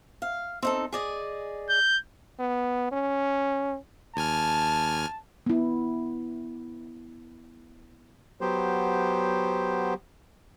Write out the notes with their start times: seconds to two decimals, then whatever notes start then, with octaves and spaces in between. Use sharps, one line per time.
0.22 F5
0.62 C4 D#4 A4
0.92 G#4 D5 D#5
1.69 G6
2.39 B3
2.92 C#4
4.16 D#2 G#5 A5 F6
5.46 B3 E4
8.41 F#3 B3 G4 C5